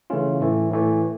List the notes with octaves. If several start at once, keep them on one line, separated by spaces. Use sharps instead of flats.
C#3 E3 A3 C#4 F4
A2 E3 A3
A2 E3 A3